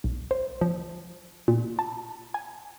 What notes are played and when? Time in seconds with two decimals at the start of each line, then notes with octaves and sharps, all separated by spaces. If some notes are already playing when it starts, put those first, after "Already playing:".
0.04 B1
0.31 C5
0.61 F3
1.48 A#2
1.79 A5
2.34 G#5